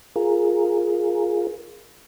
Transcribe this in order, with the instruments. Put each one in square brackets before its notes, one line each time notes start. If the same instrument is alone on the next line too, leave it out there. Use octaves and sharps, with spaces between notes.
[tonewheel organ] F4 G#4 A#4